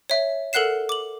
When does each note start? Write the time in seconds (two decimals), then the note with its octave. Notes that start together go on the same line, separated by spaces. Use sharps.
0.10 C#5 E5
0.53 A4 A#4 F#5 F#6 C7 E7
0.89 D6 F#7